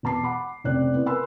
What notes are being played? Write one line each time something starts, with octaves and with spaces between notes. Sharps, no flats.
E1 B3 A5 D6 C7
F#5 B5 D6
F1 C#3 C4 D5 F#6
B3 E4
A#4 B4 G#5 B5 C6 E6